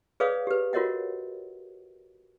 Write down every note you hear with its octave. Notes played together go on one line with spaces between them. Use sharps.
G#4 B4 C#5 D5 F5 D#6
G4 B4
F4 F#4 A#4 C#5 D#5 F#5